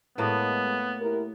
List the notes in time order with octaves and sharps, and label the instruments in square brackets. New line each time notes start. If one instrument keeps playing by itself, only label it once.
[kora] A2 A#3 B4 [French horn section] G#3 [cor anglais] B3
[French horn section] E4 G4 A#4